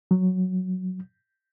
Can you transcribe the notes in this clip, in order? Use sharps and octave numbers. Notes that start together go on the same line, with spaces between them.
F#3